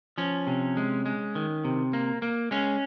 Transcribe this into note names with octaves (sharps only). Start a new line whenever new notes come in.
F3 C#4
C3
G#3
G#3
D#3
C3
A#3
A#3
G#3 C#4